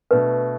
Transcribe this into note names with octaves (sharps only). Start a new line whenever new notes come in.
B2 A3 D4 B4